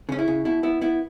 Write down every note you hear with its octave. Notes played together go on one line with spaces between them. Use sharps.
C#3 C#4
E4
C#3
B2 E4
B3 E4
B3 E4